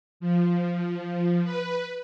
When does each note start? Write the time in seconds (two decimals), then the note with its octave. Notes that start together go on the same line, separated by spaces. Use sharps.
0.20 F3
1.44 B4